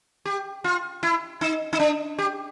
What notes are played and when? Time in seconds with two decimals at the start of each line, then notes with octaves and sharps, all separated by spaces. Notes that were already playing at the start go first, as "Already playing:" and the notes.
0.25 G4
0.64 F4
1.03 E4
1.41 D#4
1.73 D#4
1.79 D4
2.18 G4